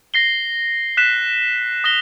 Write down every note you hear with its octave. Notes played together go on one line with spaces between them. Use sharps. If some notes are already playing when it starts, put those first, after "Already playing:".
A#6 C7 G7
F#6 B6 E7
D#6 A#6 G7